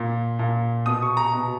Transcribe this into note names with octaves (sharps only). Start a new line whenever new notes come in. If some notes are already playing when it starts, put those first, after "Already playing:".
Already playing: A#2
A#2
B2 D#6
C#6
A#5
B2